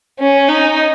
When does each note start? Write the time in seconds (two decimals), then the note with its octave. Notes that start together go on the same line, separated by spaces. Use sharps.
0.20 C#4
0.48 D#4